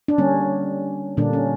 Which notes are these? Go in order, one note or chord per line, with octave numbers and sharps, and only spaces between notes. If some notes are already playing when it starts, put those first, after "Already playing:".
D4
D3 G3 A#3 C#4
A#2 D3 G3 A#3 D4
C#4